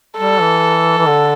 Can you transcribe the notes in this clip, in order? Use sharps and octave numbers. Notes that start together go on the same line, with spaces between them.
G3 A4
E3
E3
D3